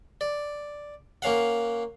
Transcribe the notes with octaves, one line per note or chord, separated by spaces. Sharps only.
D5
A#3 C#4 F5 F#5